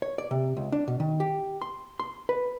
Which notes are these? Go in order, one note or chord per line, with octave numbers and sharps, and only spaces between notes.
C#5
D5
C3
C#2
D4
B2
D#3
G4
C6
C6
B4